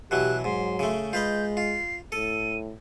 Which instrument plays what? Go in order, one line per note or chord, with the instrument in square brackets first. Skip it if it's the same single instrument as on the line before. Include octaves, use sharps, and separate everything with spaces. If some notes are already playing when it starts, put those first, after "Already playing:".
[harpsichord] B2 E3 F#3 [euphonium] G4 [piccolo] F#6
[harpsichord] G#2 [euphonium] F#3 [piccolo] C6
[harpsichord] C#3 A3
[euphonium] G#3 [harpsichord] F4 B4 D#5 [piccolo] G6
[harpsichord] F4 [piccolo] C7
[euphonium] A2 [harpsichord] A4 [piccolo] D#7